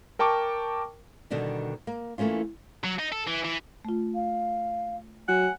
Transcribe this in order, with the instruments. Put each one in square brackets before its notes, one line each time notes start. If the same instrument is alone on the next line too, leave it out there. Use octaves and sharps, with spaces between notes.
[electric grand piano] A#4 G5 A5 C#6 D6
[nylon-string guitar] B2 D3 D#3 G3 B3
A#3
E3 A3 A#3 C#4 F4
[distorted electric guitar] F#3
D#4
A4
E3
E3
[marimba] A3 F4
[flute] F5
[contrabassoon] F#3 [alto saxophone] F#5 [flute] G#5